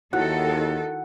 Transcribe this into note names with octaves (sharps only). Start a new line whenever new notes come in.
D#2 D#3 E4 F#4 A4 F#5